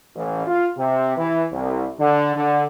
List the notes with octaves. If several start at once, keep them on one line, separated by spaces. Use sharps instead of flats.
A1
F4
C3
E3
C2
D3
D3